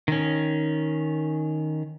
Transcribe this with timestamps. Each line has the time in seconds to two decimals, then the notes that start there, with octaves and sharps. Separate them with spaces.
0.08 D#3 C#4